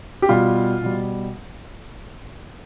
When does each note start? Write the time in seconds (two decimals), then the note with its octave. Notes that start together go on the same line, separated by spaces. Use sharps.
0.22 G4
0.29 B2 G3 F4
0.83 B2 G3